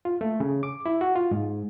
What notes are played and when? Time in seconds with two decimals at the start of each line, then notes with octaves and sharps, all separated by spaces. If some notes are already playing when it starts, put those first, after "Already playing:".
0.05 F4
0.21 A3
0.40 C#3
0.63 D6
0.86 E4
1.01 F#4
1.15 F4
1.31 G#2